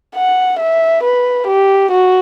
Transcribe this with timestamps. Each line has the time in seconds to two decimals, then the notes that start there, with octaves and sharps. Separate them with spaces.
0.15 F#5
0.59 E5
1.03 B4
1.47 G4
1.91 F#4